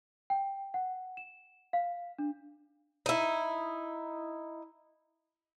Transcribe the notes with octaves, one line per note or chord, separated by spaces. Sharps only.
G5
F#5
E7
F5
D4
D#4 E4